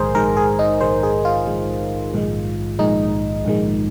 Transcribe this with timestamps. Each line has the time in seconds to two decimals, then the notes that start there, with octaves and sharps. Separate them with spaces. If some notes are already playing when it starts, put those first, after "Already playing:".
Already playing: A#1 G#2 D#3 G#3 G#4 A#4 C5
0.15 A#1 G#2 D#3 G#3 A#4
0.37 G#4
0.59 D#4
0.81 A#1 G#2 D#3 G#3 C5
1.03 G#4
1.25 F4
1.47 A#1 G#2 D#3 G#3
2.13 A#1 G#2 D#3 G#3
2.79 A#1 G#2 D#3 G#3 D#4
3.45 A#1 G#2 D#3 G#3